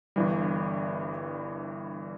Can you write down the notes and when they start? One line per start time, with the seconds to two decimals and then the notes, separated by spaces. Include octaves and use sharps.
0.16 G1 G2 E3 G3